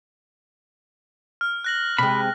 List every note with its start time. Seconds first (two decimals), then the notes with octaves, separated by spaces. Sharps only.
1.41 F6
1.64 F#6 A#6 F#7
1.98 C3 G#3 B5